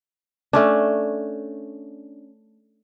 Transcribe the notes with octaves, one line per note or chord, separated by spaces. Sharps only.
A3 C#4 D4